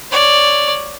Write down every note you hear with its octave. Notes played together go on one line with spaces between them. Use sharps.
C#5 D5